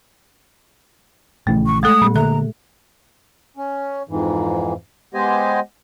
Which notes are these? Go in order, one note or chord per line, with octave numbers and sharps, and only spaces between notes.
A#1 C#3 E3 A3
C#6
G#3 A3 A4 D#6
A#2 G3 B3
D3 A#3 A4 E5 A#5 F#6
C#4
F2 G#2 E3
G#3 B3 G4 C5 D#5 G#5